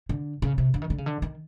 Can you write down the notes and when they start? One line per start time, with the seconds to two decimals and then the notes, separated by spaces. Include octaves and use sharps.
0.09 D3
0.42 C#3
0.58 C3
0.74 D3
0.82 D#3
0.90 D3
0.98 C#3
1.06 D3
1.22 D#3